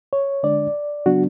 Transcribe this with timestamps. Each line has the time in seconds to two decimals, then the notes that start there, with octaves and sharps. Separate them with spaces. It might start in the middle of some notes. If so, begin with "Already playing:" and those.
0.13 C#5
0.43 D3 G#3 D4 D5
1.06 C#3 F#3 B3 D4 F#4